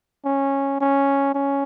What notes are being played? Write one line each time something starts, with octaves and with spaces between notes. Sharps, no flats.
C#4
C#4
C#4